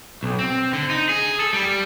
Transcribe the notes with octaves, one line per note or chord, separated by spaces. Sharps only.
B1
C4
D3
D#4
G#4
A4
G3